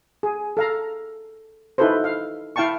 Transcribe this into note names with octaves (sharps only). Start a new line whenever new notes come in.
G#4
A4 F5 A#5
D#4 E4 F#4 A4 B4 C5
F5
E4 F5 G5 A5 C#6